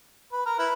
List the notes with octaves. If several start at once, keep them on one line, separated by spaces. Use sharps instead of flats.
B4
A#4
E4 B4